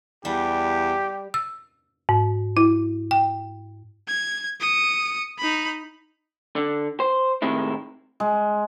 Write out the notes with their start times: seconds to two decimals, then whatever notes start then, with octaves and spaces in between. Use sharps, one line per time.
0.25 E2 G3 G4
1.34 E6
2.09 G#2
2.57 E4
3.11 G5
4.08 G#6
4.60 D#6 C#7
5.39 D#4 B5
6.56 D3
7.00 C5
7.42 A2 C3 D#3 G#3 E4
8.20 G#3